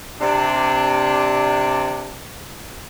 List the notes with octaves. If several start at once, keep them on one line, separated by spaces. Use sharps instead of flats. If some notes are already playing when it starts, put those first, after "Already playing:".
C3 D4